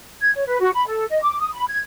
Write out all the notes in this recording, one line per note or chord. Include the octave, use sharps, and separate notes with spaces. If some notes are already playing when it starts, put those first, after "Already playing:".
G#6
C#5
B4
F#4
B5
A4
D#5
D6
D#6
B5
G#6